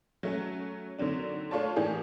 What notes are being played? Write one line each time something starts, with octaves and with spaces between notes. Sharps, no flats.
F#3 A3 C#4
D3 D#3 F#3 C4 D4
A3 D4 F4 C#5 D5 A5
A2 E3 A#3 D4 G4 G#4